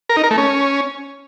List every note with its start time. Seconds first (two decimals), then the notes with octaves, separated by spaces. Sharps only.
0.09 A#4
0.17 D#4
0.24 A#4
0.31 A3
0.38 C#4